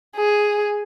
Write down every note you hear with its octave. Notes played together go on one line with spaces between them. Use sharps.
G#4